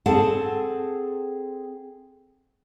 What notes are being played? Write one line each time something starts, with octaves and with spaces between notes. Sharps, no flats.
C4 G#4 A4 F#5 A5